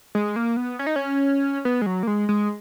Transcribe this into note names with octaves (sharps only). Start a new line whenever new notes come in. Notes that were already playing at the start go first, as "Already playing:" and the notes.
G#3
A#3
B3
C#4
D#4
C#4
B3
G#3
F#3
A#3
G#3
G#3